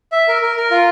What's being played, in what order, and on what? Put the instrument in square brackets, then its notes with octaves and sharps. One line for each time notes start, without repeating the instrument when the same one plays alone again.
[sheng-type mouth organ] E5
A#4
A#4
A#4
F4